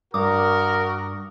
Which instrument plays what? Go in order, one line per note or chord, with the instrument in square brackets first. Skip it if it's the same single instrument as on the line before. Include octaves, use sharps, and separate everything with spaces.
[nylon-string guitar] G2 [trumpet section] F#4 A#4 [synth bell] D6 D#6